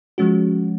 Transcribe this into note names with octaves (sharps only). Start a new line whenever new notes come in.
F3 G#3 C#4 F#4